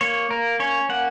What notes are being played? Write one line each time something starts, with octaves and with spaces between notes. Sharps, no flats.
A#3 C#5
A#3 A#4
C#4 C#5
A#3 F#5